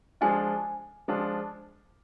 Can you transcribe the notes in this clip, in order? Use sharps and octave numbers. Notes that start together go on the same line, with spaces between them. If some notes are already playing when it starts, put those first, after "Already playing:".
F3 G#3 D4 F4 G#5
F3 G#3 D4 F4